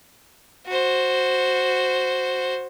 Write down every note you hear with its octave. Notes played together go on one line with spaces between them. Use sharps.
F#4 C5